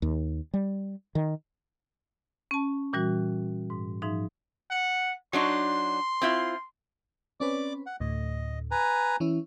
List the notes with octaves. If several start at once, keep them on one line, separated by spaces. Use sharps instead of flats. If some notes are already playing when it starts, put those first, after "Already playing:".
D#2
G3
D#3
C#4 A5
A#2 E3 G3 F#4
G#2
G#2 F3 D#4 E5
F#5
F#3 D4 D#4 C6
C4 E4 F4
C4 C#4 B4 D5 D6
F#5
D2 A2 D#5
B4 G#5 A#5
E3 C#4 E4